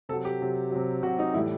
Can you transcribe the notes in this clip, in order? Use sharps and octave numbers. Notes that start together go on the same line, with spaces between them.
C3 F#3 A4
G4
C3 F#3
C3 F#3
C3 F#3 F#4
D#4
A2 E3 G3 E4